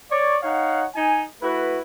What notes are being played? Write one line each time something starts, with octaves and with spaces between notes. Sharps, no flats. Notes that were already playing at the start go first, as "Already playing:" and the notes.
C#5 D5
D#4 C#5 F5 F#5
D#4 G#5
A3 E4 F#4 B4